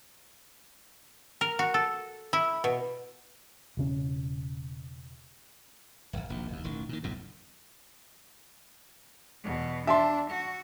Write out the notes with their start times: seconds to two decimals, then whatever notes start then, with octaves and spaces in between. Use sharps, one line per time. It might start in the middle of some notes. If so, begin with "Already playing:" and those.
1.41 A#4
1.59 F#4
1.74 A4
2.33 E4
2.64 B2
3.77 E1 C#3 C#4
6.13 D1 G1
6.29 E1 A#1 D#2
6.48 F#1 D#2
6.64 E1 A1 D#3
6.89 A#2 D#3
7.03 F#1 B1 F#2 A2
9.44 E2 B2
9.87 D4 E5 A5 C6
10.31 F#4